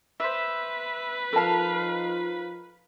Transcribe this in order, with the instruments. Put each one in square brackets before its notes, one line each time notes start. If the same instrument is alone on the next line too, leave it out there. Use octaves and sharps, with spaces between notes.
[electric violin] B4 [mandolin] C5 E5
[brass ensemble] F3 D#4 F4 [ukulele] A4 A5 [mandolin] A#4 F5